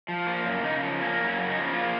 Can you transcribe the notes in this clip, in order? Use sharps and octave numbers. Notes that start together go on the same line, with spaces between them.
F3
A#3 C5
F#2
C#3 D#4
F3
A#3 C#4
F#2
C#4
C#3
D#4
F3
A#3 F4